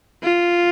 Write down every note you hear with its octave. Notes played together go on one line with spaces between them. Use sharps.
F4